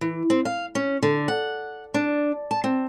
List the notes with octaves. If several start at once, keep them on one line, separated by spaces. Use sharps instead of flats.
E3
C4
F5
C#4
D3
F#5
D4
A5
C4